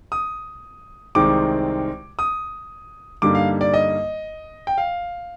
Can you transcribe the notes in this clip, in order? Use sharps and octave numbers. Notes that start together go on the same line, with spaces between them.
D#6
C2 C3 D#3 G#3 C4 D6
D#6
G2 D3 G3 A#3 D#4 D6
F5
D5
D#5
G5
F5